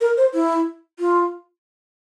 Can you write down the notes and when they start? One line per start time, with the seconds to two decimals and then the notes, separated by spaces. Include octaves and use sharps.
0.01 A#4
0.17 C5
0.34 E4
0.99 F4